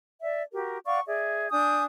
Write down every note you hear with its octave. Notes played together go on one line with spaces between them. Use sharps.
D5 E5
F#4 G4 A#4
D5 F5 F#5 C#6
G#4 D5 E5
D4 G#5 D#6 G6